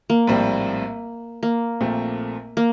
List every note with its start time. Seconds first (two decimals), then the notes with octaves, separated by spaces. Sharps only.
0.10 A#3
0.27 A#1 A2 G3 C4
1.43 A#3
1.80 A#1 A#2 A3 C4
2.57 A#3